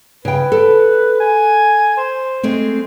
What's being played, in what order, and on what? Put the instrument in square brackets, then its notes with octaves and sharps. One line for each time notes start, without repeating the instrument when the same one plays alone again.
[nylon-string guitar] C#3 G5 [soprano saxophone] B4
[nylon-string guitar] A4
[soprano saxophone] G#5
C5
[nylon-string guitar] G#3 A3 C4